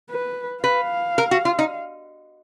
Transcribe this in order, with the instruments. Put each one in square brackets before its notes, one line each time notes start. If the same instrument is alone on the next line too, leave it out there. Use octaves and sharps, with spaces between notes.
[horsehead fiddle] B4
[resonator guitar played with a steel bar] B4 [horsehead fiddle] F5
[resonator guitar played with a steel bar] A#4
F#4
F4
D#4